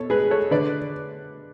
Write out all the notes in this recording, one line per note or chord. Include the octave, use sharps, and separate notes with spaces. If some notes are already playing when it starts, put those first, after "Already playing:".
Already playing: B2 A4 C#5
G#3 G#4 B4
A4 C#5
D3 B4 D5